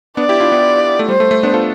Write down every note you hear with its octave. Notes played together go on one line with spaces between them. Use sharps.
B3 D4 D5
E4 G4
D4 F4
B3 D4
A3
G3 C5
A3
A3
B3 D4
F4 A4